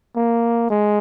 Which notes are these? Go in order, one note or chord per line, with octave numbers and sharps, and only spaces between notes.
A#3
G#3